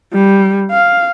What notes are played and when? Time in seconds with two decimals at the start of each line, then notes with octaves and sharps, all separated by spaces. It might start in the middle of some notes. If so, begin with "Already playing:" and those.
0.13 G3
0.71 F5